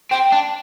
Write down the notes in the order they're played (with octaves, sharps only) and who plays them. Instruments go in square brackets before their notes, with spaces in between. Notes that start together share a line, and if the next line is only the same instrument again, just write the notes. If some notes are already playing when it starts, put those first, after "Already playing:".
[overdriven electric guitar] C4 [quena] G5
[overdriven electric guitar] D4